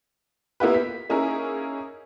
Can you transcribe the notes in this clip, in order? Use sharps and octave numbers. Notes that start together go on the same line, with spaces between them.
A#3 B3 E4 F4 G4 B4
B6
A#3 C#4 D#4 E4 G#4 A#4